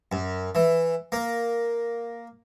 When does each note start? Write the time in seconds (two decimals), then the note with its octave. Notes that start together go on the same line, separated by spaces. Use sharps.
0.12 F#2
0.55 E3
1.12 A#3